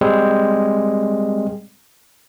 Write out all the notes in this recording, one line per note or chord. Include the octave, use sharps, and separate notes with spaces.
G3 G#3 C4